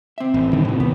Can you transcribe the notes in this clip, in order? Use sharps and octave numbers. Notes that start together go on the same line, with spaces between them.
C4 E5
A1
G2 D3 D#3
A2 C3
D#2 B3